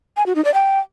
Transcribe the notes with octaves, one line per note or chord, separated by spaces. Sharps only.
G#5
F#4
D#4
D5
G5